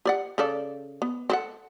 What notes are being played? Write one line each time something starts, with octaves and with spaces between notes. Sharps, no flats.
G4 D5 F#5
C#3 A4 D5
B3
C4 A4 F#5